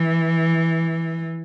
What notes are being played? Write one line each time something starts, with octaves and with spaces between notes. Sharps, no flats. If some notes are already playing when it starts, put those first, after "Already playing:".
Already playing: E3